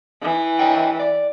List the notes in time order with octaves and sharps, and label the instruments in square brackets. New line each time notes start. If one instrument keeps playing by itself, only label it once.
[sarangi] E3
[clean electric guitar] C#5 D#5 G5
D5